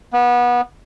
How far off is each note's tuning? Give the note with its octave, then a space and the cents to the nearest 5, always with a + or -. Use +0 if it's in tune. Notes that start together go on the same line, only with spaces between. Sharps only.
B3 -25